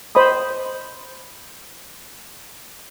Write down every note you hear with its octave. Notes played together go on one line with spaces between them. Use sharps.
C5 D#5 B5 D#6